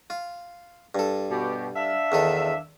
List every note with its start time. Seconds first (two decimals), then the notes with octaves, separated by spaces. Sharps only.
0.10 F4
0.95 G2 A4
1.30 B2 G4
1.76 D4 E5 F5
2.12 E2 D#3 A4